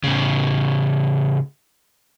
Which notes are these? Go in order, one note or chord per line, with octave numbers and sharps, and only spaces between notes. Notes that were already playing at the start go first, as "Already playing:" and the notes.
A2 C#3